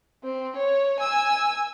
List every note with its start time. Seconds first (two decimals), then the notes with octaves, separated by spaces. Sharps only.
0.23 C4
0.57 C#5
1.00 G#5 E6